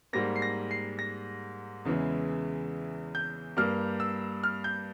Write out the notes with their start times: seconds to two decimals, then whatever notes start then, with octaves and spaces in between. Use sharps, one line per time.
0.13 G#2 G3 A#3 A#6
0.36 C7
0.42 A#6
0.71 C7
0.99 A#6
1.85 E2 C#3 E3 G#3
3.15 G6
3.57 G2 G3 A#3 F6
4.00 E6
4.43 F6
4.64 G6